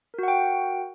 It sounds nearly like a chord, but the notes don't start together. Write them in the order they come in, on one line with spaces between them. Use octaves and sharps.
A#4 F#4 F#5 G5